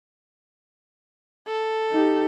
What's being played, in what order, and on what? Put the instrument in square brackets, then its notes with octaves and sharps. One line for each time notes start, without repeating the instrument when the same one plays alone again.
[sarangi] A4
[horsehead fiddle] D#4 G4